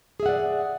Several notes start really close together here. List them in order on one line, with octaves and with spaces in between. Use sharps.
G#4 E5 F#5 D5